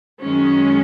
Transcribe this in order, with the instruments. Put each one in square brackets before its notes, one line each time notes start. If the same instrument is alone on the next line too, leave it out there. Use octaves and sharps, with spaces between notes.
[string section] F#2 D#3 G#3 C#4